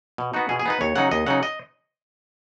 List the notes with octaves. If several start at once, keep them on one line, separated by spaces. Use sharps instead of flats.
B2
B3 D#4 F#4
B2 G#4
G#4
B3 D#4 B4
D#2 C#5
C#3 F#3 D#4 F#5
D#2 D#5
C#3 F#3 D#4 F#5
D#5